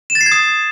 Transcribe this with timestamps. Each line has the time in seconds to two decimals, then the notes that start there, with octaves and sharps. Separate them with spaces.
0.10 E7
0.15 A6
0.21 C7
0.26 G#6
0.32 D#6